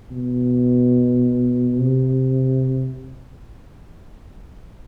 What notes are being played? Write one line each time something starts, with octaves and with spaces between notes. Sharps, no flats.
B2
C3